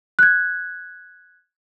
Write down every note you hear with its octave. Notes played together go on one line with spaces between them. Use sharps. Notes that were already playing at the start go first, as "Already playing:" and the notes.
F#6 G#6